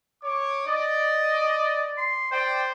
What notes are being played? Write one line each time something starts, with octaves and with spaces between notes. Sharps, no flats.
C#5 D6
D5 D#5
C6
C5 D5 G5